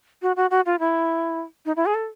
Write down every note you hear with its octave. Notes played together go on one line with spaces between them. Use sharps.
F#4
F#4
F#4
F4
E4
D#4
E4
G#4
A4